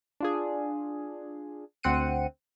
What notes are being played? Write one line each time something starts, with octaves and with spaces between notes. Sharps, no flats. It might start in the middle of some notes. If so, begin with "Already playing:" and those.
D4 F4 G#4
D2 C4 F#5 C#7 D#7